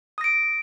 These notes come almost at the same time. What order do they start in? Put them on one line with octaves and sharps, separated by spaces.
D#6 A#6 D7